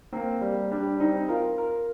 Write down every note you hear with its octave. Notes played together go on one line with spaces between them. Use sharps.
A#3 C4
G3
G3 D4
C4 D#4
F4 A#4
A#4